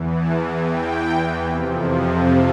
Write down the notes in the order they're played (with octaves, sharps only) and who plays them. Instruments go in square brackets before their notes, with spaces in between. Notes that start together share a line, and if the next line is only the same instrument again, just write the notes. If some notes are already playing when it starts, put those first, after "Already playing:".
Already playing: [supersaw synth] E2 E3
A5
G5
F2 C3 F3